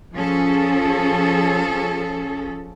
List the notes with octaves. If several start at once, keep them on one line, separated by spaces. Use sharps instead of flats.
F3 C#4 G#4 A4